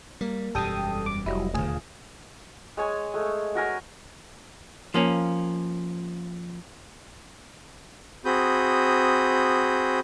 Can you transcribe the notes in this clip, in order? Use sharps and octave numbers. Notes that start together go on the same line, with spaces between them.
G3 A#3
E1 F#2 B2 G3 A4 G5 D#6
D6
F1 F#3 G3 E4 D#5
D#1 G#1 D2 F4 G#4
G#3 C#5 G#5
G#3 A3
F#4 A#4 G#5
F3 A#3 C#4
C4 F#4 G#4 B5 D#6 G6